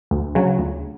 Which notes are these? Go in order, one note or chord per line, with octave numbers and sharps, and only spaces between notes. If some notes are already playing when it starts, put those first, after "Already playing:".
D2
C#3 F#3
D2